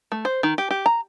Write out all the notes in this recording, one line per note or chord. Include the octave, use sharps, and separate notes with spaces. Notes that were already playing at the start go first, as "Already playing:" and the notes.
A3
C5
D#3
G4
G4
A#5